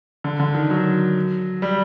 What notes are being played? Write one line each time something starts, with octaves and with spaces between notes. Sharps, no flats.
D3
D3
D#3
F#3
G3